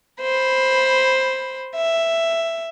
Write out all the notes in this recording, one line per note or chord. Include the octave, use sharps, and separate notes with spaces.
C5 B5
E5